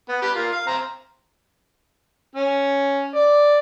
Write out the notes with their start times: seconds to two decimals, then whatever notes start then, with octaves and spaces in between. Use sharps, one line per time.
0.08 B3
0.22 G4 B4
0.35 F4 A#4
0.52 F5
0.67 C4 A#5
2.35 C#4
3.15 D5